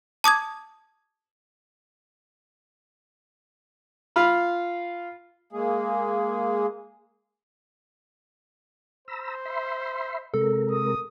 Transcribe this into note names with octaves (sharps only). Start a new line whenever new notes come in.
A5 D6 D#6 G#6
F4 F5 B5
G#3 A#3 G#4
C5 A#5 B5 E6
E5 B5 C6
C3 G#3 A4 A#4
D#6